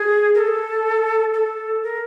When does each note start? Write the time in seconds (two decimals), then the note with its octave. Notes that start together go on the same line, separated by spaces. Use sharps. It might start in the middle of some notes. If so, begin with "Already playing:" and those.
Already playing: G#4
0.35 A#4
0.39 A4
1.34 A4
1.83 A#4